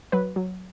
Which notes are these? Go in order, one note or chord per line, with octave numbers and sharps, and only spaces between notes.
F#3 B4
F#3